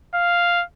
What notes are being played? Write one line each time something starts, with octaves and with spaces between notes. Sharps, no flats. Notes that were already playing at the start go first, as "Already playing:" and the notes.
F5